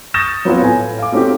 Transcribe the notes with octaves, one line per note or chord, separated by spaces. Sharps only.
C#6 D#6 G6 A6 A#6 E7
F#3 B3 C4 F4 C#5
A2 G#5
F5 D6
A3 C4 C#4 D#4 F#4 G4